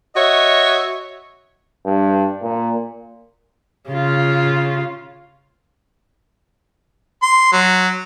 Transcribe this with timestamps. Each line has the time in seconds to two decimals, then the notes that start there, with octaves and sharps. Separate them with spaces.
0.16 F#4 C#5 D#5 E5
1.85 G2
2.42 A#2
3.90 C#3 F4
7.22 C6
7.52 F#3